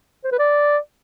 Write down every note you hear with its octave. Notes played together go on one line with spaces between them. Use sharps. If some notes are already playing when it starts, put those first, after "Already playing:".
C5
B4
D5